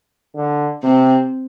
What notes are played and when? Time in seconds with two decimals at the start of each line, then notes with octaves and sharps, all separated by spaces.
0.36 D3
0.82 C3 C4